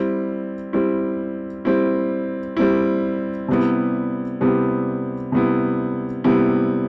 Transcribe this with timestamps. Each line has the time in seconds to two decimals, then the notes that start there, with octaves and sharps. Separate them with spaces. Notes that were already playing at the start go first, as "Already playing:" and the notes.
Already playing: G3 C4 E4
0.73 G3 C4 E4
1.65 G3 C4 E4
2.57 G3 C4 E4
3.48 C3 G3 B3 E4
4.41 C3 G3 B3 E4
5.32 C3 G3 B3 E4
6.24 C3 G3 B3 E4